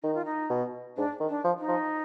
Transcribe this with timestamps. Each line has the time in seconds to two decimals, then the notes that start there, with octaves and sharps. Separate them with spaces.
0.03 D#3 D#4
0.14 F4
0.25 D#4
0.50 B2
0.96 G#2 D4
1.20 D#3
1.29 D4
1.44 F3
1.59 D#4
1.68 F3